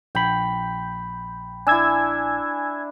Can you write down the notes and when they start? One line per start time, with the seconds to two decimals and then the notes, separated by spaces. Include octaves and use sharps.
0.15 A#1 G5 B5
1.67 D4 E4 G#5 E6 G#6